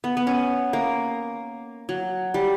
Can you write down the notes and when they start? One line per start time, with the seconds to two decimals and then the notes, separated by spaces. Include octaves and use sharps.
0.04 B3
0.17 B3
0.27 C#4
0.73 A#3
1.89 F#3
2.34 G3